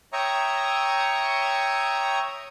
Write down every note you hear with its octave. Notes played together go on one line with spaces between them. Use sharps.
C#5 E5 G5 A#5 C#6 D#6